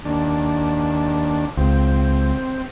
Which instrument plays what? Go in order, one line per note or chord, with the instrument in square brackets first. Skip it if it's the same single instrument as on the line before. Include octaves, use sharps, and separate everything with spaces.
[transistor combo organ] D#2 D4
[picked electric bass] C#2 [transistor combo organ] C4